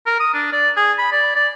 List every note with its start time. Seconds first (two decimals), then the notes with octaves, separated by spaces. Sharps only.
0.07 A#4
0.20 D#6
0.34 D4
0.53 D5
0.77 G#4
0.98 B5
1.12 D5
1.36 D5